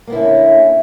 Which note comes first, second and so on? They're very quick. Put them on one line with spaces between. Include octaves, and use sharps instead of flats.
A#3 B3 E4 D3 C#4